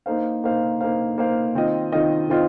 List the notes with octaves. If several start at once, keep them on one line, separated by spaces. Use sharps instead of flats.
A#3 D#4 C5 F5
A#3 D#4 C5 F5
A#3 D#4 C5 F5
A#3 D#4 C5 F5
D#3 C4 F4 D#5
D#3 C4 F4 D#5
D#3 C4 F4 D#5